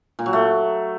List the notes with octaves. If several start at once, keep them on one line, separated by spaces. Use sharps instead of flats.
A#2
F#3
A3